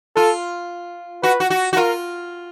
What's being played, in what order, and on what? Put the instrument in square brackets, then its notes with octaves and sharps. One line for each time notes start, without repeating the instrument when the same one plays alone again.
[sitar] F4 [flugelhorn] A4
[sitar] F#4 [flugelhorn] B4
[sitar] F#4
F#4
F#4
[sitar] F4 [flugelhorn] A#4